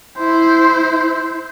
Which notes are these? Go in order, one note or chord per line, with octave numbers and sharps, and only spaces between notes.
E4 C5